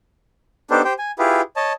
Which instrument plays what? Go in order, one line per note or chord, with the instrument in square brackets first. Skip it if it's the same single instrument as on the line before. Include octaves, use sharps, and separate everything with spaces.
[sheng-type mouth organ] B3 D4 D#4 G4 A4 C5
G4 C5 G5
G#5
E4 F4 G4 G#4 B4
C#5 D#5 A5